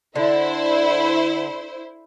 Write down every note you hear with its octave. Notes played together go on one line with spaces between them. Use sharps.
D3 E4 C5